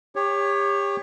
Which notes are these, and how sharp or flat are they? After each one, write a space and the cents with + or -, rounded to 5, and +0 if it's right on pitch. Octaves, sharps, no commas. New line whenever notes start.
G4 +30 C#5 +0